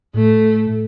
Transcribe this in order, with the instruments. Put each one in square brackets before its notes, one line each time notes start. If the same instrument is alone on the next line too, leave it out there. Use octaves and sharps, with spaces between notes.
[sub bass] A2 [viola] A3